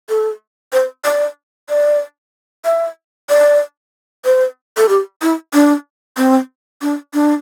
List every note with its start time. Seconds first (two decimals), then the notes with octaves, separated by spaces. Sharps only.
0.09 A4
0.73 C5
1.05 D5
1.69 D5
2.65 E5
3.29 D5
4.25 C5
4.77 A4
4.89 G4
5.22 E4
5.53 D4
6.17 C4
6.82 D4
7.14 D4